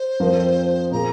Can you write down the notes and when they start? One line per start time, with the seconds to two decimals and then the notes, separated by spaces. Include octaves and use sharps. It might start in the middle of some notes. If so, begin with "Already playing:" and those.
Already playing: C5
0.20 F2 F3 C4 F4 A#4
0.92 A#2 A#3 G#4 A#5